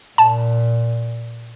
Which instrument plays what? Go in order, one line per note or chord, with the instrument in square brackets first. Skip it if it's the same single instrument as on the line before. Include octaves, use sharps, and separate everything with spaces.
[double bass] A#2 [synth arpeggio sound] A5